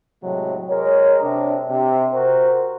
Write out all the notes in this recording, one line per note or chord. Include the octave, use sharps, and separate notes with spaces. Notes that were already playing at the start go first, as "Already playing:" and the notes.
A2 C3 F#3 G#3
G#3 A#4 C#5
C3 D4
C3
F#4 A#4 C5